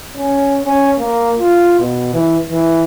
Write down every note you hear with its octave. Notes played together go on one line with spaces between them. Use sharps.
C#4
C#4
A#3
F4
B2
E3
E3